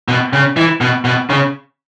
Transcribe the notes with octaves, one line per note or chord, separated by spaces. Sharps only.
B2
C#3
E3
B2
B2
C#3